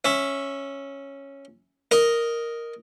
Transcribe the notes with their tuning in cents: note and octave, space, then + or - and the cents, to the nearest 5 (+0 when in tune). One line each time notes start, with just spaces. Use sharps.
C#4 -5 E5 +0
A#4 +0 D#5 +0